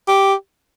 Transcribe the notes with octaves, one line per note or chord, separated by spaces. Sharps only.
G4